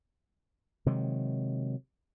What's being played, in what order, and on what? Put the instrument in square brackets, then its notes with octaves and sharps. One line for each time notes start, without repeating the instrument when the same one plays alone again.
[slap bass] C3 D#3 F#3 G#3